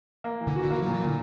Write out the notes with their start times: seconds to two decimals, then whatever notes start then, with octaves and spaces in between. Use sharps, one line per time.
0.24 A#3
0.40 E3
0.47 D3
0.56 F#4
0.62 D3
0.70 E3 A#3
0.82 A#2 F#3
0.93 E3
1.01 A#2 D3